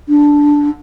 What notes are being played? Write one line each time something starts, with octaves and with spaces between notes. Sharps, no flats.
D4